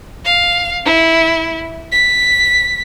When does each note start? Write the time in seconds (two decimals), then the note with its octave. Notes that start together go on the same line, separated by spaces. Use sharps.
0.25 F5
0.85 E4
1.92 B6